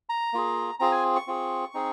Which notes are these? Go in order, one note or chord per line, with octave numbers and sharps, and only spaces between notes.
A#5
A#3 F4 G#4
C4 F4 G#4 A#5
G#5
C#6
C4 F4 G#4
C4 D#4 G#4